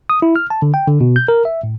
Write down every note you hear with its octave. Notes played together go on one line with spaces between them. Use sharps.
D#6
E4
F6
A5
D3
G5
D3
B2
G6
A#4
E5
A2